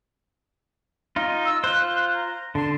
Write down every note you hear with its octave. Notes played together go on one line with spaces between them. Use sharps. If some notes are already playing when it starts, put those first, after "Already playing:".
D#4 F4
E6
F4 C5 F#6
A#5
D3 A5 C6